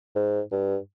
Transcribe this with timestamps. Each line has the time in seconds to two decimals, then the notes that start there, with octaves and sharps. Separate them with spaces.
0.15 G#2
0.52 G2